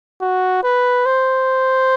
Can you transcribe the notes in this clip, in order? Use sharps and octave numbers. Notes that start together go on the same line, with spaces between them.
F#4
B4
C5